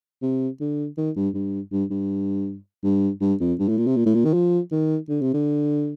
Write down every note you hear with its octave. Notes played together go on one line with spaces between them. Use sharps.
C3
D3
D#3
G2
G2
G2
G2
G2
G2
F2
G2
A2
A#2
C3
A#2
A2
A#2
D#3
F3
D#3
D3
C3
D3